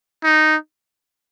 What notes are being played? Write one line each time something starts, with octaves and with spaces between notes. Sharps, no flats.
D#4